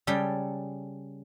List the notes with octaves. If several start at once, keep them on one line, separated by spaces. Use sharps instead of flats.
C#3 G3 A4 G5